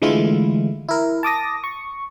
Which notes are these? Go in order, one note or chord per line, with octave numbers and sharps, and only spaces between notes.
D3 E3 G#3 A3 E4 F4
E4 A#4
A5 D6 D#6 A#6
C#6